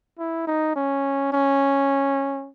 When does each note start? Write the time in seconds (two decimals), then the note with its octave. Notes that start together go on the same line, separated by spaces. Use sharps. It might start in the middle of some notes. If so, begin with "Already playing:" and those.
0.18 E4
0.47 D#4
0.76 C#4
1.33 C#4